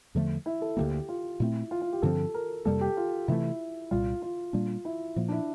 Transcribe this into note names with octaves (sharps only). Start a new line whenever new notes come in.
E2 D3 F3 A3
E4
A4
D2 D3 G3 A#3 G4
F4
A#2 A3 C4 E4
F4
F4
G4
G2 D3 F3 C4 A4
A#4
F2 C3 G3 A#3 A4
G4
F4
C3 E3 A3 E4
C2 A#2 G3 F4
F4
A#2 G3 A#3 D4
E4
A#2 F3 A#3
D4
E4